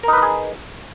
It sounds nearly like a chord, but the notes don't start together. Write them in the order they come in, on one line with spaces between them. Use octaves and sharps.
A#4 D#4 B4 D#5 G#4